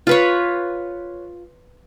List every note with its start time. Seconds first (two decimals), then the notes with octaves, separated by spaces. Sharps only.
0.07 F4 B4 C#5